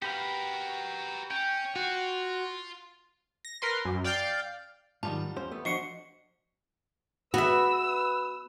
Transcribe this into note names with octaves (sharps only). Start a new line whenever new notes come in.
F#4 G4 A#4 B4 F5
C#4 G5
F4 F#4
A#6
A#4 B4 C6
F#2
D5 F5 G5 F6 G6 A6
G#2 D#3 F#3 G3 F4 A5
E2 C#4 C5
A3 B3
F3 D4 F#4 D#5 F#5 C7 C#7
B3 F#4 B4 E5 E6